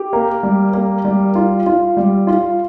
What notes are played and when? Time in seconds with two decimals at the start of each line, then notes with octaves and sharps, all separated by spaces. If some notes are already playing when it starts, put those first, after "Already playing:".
Already playing: G4
0.13 A#3
0.43 G3
0.74 A#3
1.05 G3
1.35 F4
1.66 F4
1.97 G3
2.27 F4